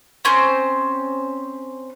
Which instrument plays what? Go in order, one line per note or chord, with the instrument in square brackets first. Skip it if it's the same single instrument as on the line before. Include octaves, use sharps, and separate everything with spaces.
[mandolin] C4 C#4 C5